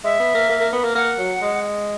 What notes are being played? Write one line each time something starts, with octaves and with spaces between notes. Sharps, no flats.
G#3 E5
B3
A#3
A#3
A#3
B3
A#3
A#3 F#5
F#3
G#3